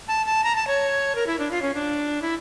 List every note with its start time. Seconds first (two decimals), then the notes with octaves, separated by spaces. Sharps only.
0.08 A5
0.26 A5
0.44 A#5
0.55 A5
0.67 C#5
1.15 A#4
1.27 E4
1.39 D4
1.51 F4
1.62 C#4
1.74 D4
2.22 E4